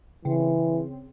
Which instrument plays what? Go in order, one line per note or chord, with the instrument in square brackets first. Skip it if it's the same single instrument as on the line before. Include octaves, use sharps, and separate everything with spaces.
[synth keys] C#3 C4 [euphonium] E3